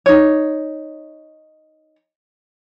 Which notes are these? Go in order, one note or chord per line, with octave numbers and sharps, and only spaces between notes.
D#4 C#5